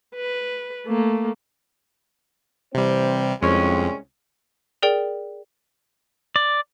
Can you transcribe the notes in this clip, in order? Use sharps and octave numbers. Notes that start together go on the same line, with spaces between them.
B4
A3 A#3
C3 E3 G3 C4 C5
C2 F2 G#3 C#4
G#4 A#4 D5 G5
D5